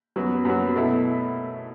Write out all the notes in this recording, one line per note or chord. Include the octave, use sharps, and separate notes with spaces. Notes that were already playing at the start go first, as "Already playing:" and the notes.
F#2 F#3 B3 F#4
F#2 F#3 B3 F#4
B2 A3 E4